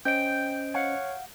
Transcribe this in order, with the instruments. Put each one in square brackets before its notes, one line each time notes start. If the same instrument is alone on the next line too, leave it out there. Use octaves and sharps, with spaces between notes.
[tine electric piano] C#4 C5 D#5 [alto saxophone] G5 [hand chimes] G6 D7
[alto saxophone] C#5 [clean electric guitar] F5 F#5